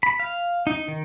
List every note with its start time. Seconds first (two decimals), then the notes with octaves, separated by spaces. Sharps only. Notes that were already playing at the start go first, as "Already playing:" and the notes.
0.03 B5
0.20 F5
0.67 D#4
0.88 D#3